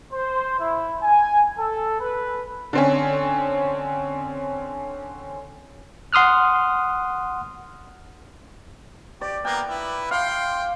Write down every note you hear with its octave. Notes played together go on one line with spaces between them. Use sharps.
C5
E4
G#5
A4
B4
D3 C4 C#4
F#5 C6 D#6 F6 F#6
G4 D5
A#3 B3 A#4 G5
E4 B4
F5 G5 C6